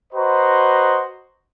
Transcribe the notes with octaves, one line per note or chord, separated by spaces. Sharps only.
F#4 B4 C5 D#5 A#5 C6